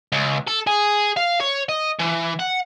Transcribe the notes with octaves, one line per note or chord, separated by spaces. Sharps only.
C#2
A4
G#4
F5
C#5
D#5
E3
F#5